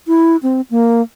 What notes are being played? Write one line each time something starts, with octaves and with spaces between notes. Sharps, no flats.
E4
C4
A#3